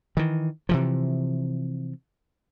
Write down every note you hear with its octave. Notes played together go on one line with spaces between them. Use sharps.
D#3 E3
C3 E3 F3